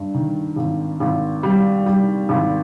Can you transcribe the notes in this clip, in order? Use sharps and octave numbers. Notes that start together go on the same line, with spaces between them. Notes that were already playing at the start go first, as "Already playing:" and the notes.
Already playing: G2
D#3
G#1
G#1
G3
G3
G#1